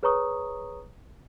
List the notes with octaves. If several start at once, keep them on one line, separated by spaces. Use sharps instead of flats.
G#4 B4 C#5 A#5 C#6 D#6